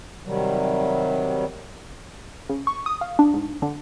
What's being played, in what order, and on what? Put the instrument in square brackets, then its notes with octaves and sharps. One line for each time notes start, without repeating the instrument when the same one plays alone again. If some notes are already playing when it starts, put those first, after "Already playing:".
[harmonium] C3 D#3 F#3 G3
[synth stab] C#3
C#6
D#6
F5
D4
G#2
D3